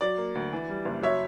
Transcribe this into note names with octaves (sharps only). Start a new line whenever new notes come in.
F#3 D5
A#3
D2
E3
G3
F#1
F#3 C#5 E5